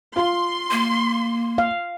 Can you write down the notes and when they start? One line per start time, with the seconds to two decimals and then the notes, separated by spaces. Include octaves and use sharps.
0.16 F4 C6
0.71 A#3
1.58 F5